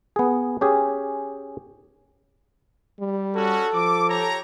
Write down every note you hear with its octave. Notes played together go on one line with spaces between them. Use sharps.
B3 G#4
C#4 G4 G#4
G3
C#4 F#4 A4
F3 D6
G4 C#5 A#5